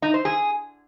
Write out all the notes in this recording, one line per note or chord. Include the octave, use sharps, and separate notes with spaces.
D#4
C5
G#4